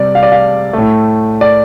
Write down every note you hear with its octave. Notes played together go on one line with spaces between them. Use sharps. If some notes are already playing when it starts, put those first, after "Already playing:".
Already playing: C3 G3 D5
F5
D5
F5
A2 A3
D5